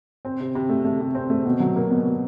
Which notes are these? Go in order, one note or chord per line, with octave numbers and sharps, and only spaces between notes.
C4
C3
C3
A3
A3
C3
C4
A3
B2
F#3
A#3
B2
B2